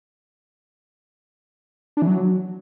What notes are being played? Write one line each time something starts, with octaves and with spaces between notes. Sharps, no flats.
D4
E3
F#3